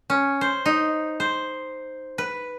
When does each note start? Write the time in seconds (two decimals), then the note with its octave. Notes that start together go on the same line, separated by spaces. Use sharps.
0.10 C#4
0.41 C5
0.66 D#4
1.20 C5
2.18 B4